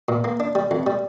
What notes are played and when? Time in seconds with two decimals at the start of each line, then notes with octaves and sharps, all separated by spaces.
0.09 A#2
0.24 A#3
0.40 D4
0.55 G3
0.71 F2
0.86 G3